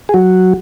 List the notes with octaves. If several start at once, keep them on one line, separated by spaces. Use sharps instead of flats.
G#4
F#3 F#4